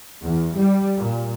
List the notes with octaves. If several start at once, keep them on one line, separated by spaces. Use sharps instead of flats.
E2
G3
A#2